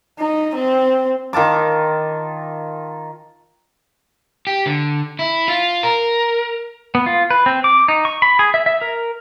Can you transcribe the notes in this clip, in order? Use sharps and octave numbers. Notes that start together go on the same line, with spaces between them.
D#4
C4
D#3 F4 A5 D6
G4
D3
E4
F4
A#4
B3
F4
B4
C4
D6
D#4
C#6
B5
G#4
E5
E5
A#4